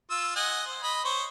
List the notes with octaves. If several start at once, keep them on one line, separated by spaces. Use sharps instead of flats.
F4 E6
D#5 F#5 G#5
C5
D#5 B5
C5 C#5